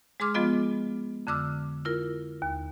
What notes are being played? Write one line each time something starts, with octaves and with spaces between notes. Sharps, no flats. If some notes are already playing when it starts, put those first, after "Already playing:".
G#3 G#4 C6 D6 F6
F3 G#3 B3 F4 G#4 D#5
F2 D3 D6 E6 F6
E4 F4 A#4
D#2